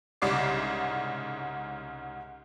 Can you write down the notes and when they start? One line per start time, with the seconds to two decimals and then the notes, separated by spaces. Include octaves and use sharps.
0.22 C2 G#2 C#3 D5 D6 C7